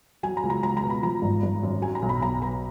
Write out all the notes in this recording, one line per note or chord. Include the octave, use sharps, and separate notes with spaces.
F#3 G#5
A#5
C#2
A#5
C#2 A#5
A#5
B2
B5
F3 A#5
G#1
G#1
F#2
F#3 G#5
A#5
B1
B5
B1 A#5
B2 B5